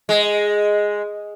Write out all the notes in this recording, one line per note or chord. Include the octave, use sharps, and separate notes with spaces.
G#3